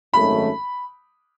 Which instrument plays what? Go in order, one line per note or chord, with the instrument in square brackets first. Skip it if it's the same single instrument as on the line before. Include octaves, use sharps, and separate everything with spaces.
[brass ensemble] G#1 F#2 D#3 A3 C#4 [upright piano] B5